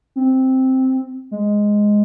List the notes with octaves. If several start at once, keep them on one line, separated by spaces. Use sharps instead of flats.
C4
G#3